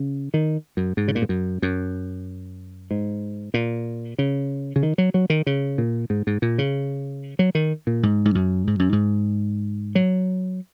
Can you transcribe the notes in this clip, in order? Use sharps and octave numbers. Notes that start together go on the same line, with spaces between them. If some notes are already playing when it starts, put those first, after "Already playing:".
Already playing: C#3
D#3
F#2
G#2
C#3
A#2
G#2
F#2
F#2
G#2
A#2
C#3
C#3
D#3
F#3
F#3
D#3
C#3
A#2
G#2
G#2
A#2
C#3
F#3
D#3
A#2
G#2
G#2
F#2
G#2
F#2
G#2
F#3